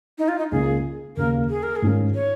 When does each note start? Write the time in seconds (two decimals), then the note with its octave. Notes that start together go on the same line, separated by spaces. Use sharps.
0.18 D#4
0.28 F4
0.38 D#4
0.52 C#2 C#3 A#3 G#4
1.16 D#2 C#3 A#3 A#4
1.49 G#4
1.63 A#4
1.76 G#4
1.82 G#2 D#3 C#4 F4
2.15 C#5